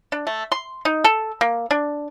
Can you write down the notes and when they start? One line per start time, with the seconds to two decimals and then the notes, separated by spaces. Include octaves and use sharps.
0.12 D4
0.27 A3
0.52 C6
0.85 D#4
1.04 A4
1.41 A#3
1.71 D4